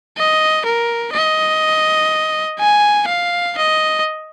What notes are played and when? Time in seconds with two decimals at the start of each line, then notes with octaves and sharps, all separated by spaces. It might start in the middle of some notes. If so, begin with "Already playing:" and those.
0.17 D#5
0.66 A#4
1.14 D#5
2.59 G#5
3.08 F5
3.57 D#5